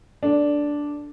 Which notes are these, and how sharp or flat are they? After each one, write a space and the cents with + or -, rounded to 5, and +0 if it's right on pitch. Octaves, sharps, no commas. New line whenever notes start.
A3 +0 D4 -5